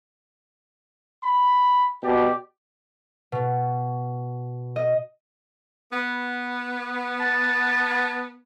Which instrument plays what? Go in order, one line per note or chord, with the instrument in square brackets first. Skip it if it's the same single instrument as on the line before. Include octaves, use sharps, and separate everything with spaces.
[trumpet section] B5
[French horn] B2 [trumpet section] G4 D5
[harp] B2
D#5
[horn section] B3
[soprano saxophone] A5